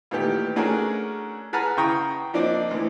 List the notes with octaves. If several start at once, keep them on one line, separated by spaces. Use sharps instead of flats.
A#2 D#3 E3 A3 B3 G4
A3 C#4 D4 F#4 G#4 A#4
G#4 B4 F#5 A5 A#5 F6
C#3 E4 G5 A#5 C#6 D#6
F3 A#3 C4 D4 D#4 D5
D2 E3